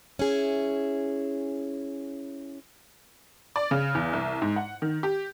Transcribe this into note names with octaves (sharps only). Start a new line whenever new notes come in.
C#4 E4 G#4
D5
C#3
E2
C2
G#2
F#5
D#3
G4